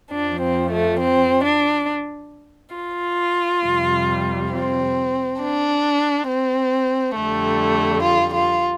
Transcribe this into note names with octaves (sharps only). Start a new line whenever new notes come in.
F2 F3 D4
C4
A3
C4
D4
F4
F2 C3 G3
C4
D4
C4
F2 D3 G3 A3
F4
F4